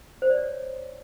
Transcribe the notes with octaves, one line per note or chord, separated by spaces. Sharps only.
C5
D5
C#5